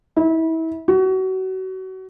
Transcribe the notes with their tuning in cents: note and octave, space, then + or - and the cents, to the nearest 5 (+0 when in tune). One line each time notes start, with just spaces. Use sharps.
E4 -30
F#4 +30